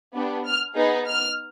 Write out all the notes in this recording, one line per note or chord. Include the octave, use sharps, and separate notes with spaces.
B3 D4 G4
F6
B3 D#4 G#4
F6